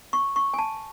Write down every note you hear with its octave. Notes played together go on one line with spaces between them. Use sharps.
C#6
C#6
G#5
A5